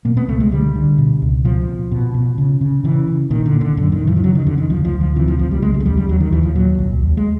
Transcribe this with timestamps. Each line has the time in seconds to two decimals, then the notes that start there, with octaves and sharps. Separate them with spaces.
0.05 B2 A#3
0.17 B3
0.28 C#2 A3
0.40 G#3
0.52 D3 G3
0.75 D3
0.98 B2
1.22 C#2
1.45 B2 F3
1.68 B2
1.92 B2
2.14 B2
2.38 C#3
2.61 C#3
2.84 C#3 E3
3.07 C#3
3.30 A#2 D#3
3.46 D3
3.53 A#2
3.61 D3
3.77 F#2 D3
3.92 D#3
4.00 F#2
4.07 E3
4.17 F3
4.23 C#3 F#3
4.35 D#3
4.46 F2 D3
4.58 D#3
4.70 D2 F3
4.85 F3
4.93 D2
5.01 F3
5.16 C3 E3
5.28 F3
5.39 C2 F3
5.51 G3
5.62 C#3 G#3
5.74 F#3
5.80 G#3
5.85 D#2 G3
5.97 G3
6.09 D#2 F#3
6.20 D#3
6.32 D#2 E3
6.43 F3
6.55 A#2 F#3
6.79 C2
7.01 D#2
7.17 G#3